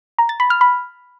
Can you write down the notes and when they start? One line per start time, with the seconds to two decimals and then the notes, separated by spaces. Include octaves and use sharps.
0.19 A#5
0.29 A6
0.40 B5
0.50 F6
0.61 B5